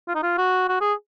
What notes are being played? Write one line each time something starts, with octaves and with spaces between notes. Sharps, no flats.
F4
D#4
F4
F#4
F#4
G#4